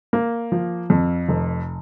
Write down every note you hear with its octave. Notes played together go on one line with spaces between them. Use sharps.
A#3
F3
F2
F1